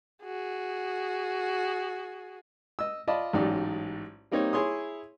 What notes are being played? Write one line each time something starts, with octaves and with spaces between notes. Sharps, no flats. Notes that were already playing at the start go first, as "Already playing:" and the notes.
F#4 G#4
D#5 E6
F4 D5 D#5 A5 B5
A1 G#2 F#3 D#4 G4 D5
G3 A#3 C4 D#4 G4 C#5
E4 G#4 C#5 C6 D#6